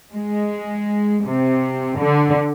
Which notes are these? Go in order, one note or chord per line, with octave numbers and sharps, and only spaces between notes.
G#3
C3
D3